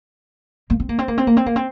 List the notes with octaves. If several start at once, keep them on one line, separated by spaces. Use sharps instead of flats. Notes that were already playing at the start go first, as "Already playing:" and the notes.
A#3
C4
A#3
C4
A#3
C4
A#3
C4
A#3
C4